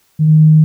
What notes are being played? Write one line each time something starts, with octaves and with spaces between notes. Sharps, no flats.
D#3